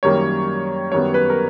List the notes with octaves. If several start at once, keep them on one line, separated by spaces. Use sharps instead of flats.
F#2 D#3 G3 A#3 C#5
F#2 D#3 G3 B3 C#5
B4
A#4